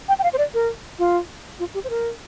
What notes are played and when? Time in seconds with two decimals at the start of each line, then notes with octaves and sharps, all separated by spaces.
0.09 G5
0.19 G5
0.24 F5
0.33 C5
0.38 D5
0.54 A#4
0.99 F4
1.60 F4
1.74 G4
1.84 C5
1.90 A#4